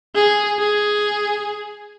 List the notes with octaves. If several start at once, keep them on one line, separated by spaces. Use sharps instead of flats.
G#4
G#4